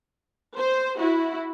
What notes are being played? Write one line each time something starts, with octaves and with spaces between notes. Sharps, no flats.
C5
E4 F#4